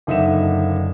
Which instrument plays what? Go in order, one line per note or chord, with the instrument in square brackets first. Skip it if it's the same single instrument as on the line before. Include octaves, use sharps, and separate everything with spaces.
[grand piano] F#1 D3 D#4 E5 F#5 E7